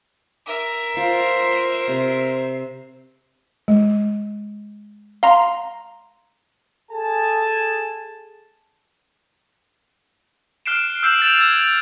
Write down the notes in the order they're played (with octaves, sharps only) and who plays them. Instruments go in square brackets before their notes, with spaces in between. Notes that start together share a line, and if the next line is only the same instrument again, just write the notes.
[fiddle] A#4 E5
[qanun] F4 [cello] C5
[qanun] C3
[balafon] G#3
[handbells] F5 A#5 C6
[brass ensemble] G#4 A4 G#5 A5
[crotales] F6 F#6 C7 D7 E7
E6 G6 C7 D7 E7
A6 D7 E7 F7
E6 G#6 E7